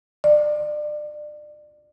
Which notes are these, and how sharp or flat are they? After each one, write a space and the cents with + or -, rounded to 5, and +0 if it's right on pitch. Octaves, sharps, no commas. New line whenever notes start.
D5 +30